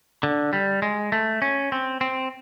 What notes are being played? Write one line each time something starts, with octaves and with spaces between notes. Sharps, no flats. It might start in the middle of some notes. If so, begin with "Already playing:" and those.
D3
G3
G#3
A3
C#4
C4
C4